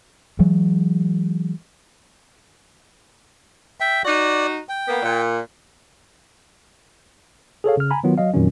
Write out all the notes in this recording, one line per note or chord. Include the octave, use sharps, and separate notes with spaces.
E3 F#3 G#3
E5 G5
D#4 F#4 D5
G5
A#3 B3
A#2
G#4 A4 C#5 F5
C#3 F6
G#5 A#5 B5
D#3 F#3 B3 F4
F#3 D#5 F5
F2 A#2 D#3 F#3 C#4